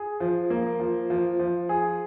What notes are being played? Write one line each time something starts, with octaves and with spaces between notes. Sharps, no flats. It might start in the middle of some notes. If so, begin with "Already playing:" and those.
Already playing: G#4
F3
A#3
F3
F3
F3
G#4